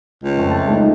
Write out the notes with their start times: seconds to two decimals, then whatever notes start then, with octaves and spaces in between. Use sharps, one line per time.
0.24 C#2
0.38 F2 A3 C4
0.51 A5
0.68 G#3 D#4